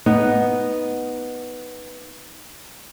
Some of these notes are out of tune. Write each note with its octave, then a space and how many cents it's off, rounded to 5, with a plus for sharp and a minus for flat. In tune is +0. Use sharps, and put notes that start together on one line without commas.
B3 +0 D#4 +0